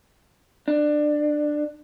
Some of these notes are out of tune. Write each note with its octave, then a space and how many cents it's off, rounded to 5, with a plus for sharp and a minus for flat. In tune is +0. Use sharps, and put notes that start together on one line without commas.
D4 +20